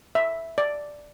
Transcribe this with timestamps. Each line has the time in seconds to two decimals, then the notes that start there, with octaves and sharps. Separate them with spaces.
0.15 E5
0.58 D5